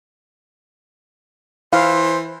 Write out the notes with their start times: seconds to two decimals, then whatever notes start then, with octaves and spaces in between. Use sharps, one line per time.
1.73 E3 C5 F5